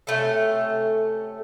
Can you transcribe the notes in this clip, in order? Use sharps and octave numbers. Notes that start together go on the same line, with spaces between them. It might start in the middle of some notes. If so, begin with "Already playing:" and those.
C3 A3 C#4 A4